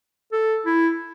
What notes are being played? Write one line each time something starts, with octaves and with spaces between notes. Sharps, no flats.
A4
E4